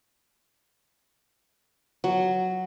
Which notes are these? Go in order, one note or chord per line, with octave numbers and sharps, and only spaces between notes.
F#3